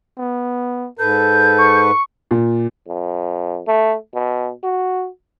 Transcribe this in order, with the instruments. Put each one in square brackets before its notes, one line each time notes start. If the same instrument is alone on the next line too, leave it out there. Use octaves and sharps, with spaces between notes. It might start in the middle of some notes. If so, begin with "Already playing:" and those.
[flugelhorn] B3
[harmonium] G#2 B4 [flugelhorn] A4 [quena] G6
[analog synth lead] C#6
[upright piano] A#2
[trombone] F2
A3
B2
F#4